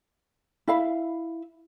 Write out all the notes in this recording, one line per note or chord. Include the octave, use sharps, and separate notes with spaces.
E4 E5 F5 B5